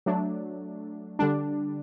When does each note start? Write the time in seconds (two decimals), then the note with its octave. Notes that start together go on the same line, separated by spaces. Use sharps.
0.06 F#3 A3 D4
1.19 D3 G3 D4